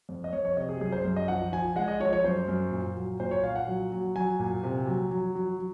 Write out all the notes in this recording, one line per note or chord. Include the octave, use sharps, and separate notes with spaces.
F2
D#5
F2 C#5
C#5
C3 D#5
G#4
F#2 G#4
C5
F#2
D#5
F3 F#5
F3 G#5
G#3 F#5
D#5
F3 C#5
C#5
F#2 C5
F#2
A#2
F#3
A#2 C5
C#5
A#2 F5
F#5
F#3
F#3
F#3 G#5
A#2
C3
F#3
F#3
F#3
F#3